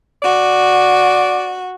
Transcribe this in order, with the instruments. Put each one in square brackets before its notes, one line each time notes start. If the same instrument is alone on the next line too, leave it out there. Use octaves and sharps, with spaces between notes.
[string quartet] F#4 [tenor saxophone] D5